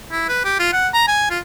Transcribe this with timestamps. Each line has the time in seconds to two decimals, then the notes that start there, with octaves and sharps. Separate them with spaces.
0.11 E4
0.29 B4
0.45 G4
0.59 F4
0.73 F#5
0.94 A#5
1.08 G#5
1.30 F4